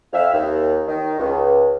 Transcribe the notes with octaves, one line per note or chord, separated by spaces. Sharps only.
F2 E5 F5
D#2
D#3
C#2